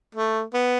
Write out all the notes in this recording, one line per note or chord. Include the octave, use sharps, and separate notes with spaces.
A3
B3